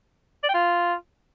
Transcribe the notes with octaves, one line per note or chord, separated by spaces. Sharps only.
D5
G5
F4